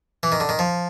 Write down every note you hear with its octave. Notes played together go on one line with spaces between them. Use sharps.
E3
D#3
D3
D#3
F3